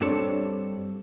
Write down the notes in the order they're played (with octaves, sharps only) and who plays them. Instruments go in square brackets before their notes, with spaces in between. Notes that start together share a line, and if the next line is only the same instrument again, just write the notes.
[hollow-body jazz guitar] G2 G3 C4 D4 A4 C#5